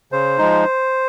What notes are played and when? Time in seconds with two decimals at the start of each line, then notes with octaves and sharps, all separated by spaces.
0.12 C#3 C5
0.38 F3 G#3 D#4